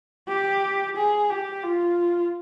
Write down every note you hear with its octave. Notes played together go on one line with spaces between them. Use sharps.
G4
G#4
G4
F4